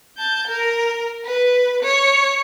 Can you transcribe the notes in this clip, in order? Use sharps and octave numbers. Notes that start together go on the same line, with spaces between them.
A5 G6
A#4
B4
C#5